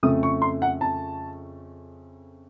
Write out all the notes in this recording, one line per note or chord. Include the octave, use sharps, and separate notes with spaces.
F2 C#3 A3 D#6
C#6
C6
F#5
A5